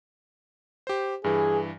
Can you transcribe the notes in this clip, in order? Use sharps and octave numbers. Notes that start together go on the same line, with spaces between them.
G4 C5
G2 E3 G#4